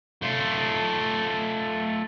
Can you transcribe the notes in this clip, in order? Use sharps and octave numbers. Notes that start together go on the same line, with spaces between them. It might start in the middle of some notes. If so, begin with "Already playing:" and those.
A3 F4